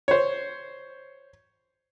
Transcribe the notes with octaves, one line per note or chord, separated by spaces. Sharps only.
C5 C#5